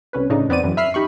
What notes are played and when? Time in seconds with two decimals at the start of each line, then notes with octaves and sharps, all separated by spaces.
0.13 C2 C#4 B4
0.30 A2 C#3 D4 D#4
0.49 F2 B3 C4 D5 D#7
0.63 F#2 E3
0.77 E5 B5 F6 C7
0.94 D#4 G4 B5 C#6